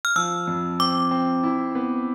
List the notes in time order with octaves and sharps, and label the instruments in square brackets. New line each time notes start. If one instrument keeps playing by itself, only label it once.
[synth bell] F6
[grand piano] F3 [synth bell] E6
[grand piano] F2
[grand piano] C4 [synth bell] D6
[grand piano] C4
E4
B3